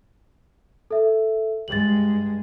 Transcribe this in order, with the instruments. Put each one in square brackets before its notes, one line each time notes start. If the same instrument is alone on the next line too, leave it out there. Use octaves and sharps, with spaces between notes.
[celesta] A4 E5
[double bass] G2 G#3 [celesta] A6 F#7